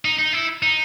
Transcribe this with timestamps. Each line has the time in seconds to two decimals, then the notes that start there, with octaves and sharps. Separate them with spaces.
0.05 D#4
0.19 D#4
0.33 E4
0.62 D#4